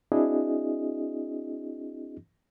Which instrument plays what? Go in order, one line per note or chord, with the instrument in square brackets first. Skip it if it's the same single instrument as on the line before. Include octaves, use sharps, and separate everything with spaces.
[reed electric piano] C4 D4 E4 F#4 G#4 D#5